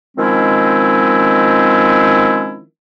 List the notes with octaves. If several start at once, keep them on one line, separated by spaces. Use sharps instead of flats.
D#3 F3 G#3 C4 C#4 E4